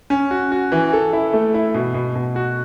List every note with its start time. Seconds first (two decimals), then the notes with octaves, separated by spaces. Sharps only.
0.10 C#4
0.31 F#4
0.52 F#4
0.72 E3
0.93 A4
1.13 E4
1.33 A3
1.54 E4
1.74 B2
1.94 B2
2.15 B2
2.36 F#4